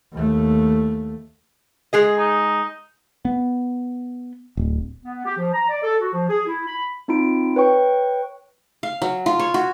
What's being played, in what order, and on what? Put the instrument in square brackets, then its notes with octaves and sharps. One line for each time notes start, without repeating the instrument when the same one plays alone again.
[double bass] D#2 A3
[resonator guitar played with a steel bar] G#3 G#4 D#5
[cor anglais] D#4
[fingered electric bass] B3
D1
[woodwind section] B3
G4
F3
A#5
D5
A4
F#4
F3
G#4
E4
B5
[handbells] C4 D#4 F4 B5 D7
B4 C#5 G5 C#6
[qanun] F5
F#3
F4
C#5
F#4